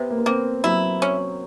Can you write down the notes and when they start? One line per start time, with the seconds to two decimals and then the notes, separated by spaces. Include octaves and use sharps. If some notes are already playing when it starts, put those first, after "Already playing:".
Already playing: C3 B3
0.10 A#3
0.18 B3
0.26 A#3 C4
0.64 F#3 E4
1.02 C#4